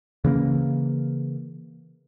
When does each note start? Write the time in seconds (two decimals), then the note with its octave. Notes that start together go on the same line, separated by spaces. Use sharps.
0.24 C#3 E3 A#3